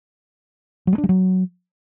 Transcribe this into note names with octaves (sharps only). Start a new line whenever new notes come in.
F#3
G#3
D4
G3
F#3